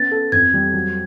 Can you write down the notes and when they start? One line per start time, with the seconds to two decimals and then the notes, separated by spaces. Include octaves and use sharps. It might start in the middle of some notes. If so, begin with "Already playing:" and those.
Already playing: B3 C#4 A6
0.11 A4
0.32 F2 G#6
0.54 G3
0.73 F#3